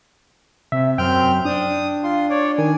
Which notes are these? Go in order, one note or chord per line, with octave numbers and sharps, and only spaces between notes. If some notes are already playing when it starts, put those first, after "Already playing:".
C3 E5
F#2 C4 G5 F6 G6
D4 D#6
F4 C6
C#5 D5
D#3 G#5